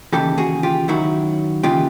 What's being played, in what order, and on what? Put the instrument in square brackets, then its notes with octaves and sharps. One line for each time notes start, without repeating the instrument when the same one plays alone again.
[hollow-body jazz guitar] D#2 C#3 E3 G4 A4
F#4 G#4
F4 G4
F#2 D#3 F#3 E4 F#4
D#2 C#3 E3 F4 G4